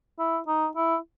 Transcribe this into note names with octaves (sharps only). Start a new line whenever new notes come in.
E4
D#4
E4